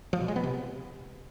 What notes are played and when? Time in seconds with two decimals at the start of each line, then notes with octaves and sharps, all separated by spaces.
0.13 F3
0.21 B2
0.28 G#3
0.36 B3
0.43 C3